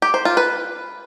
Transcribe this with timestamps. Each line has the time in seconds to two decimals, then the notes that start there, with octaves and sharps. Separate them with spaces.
0.02 G4
0.14 C5
0.25 F4
0.37 B4